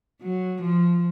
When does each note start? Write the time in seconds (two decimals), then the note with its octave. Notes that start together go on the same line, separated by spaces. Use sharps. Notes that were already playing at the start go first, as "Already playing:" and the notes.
0.22 F#3
0.62 F3